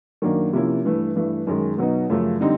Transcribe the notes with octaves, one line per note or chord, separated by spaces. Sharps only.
F#2 D#3 F#3 A#3 D4
C3 F3 A#3 C#4 E4
G2 E3 A3
G2 E3 A3
F#2 D#3 G#3
B2 F#3 B3 D#4
F#2 C#3 F3 A3
D3 G3 C4 D#4